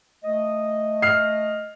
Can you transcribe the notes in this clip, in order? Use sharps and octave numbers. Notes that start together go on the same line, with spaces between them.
A3 D#5
F6 C7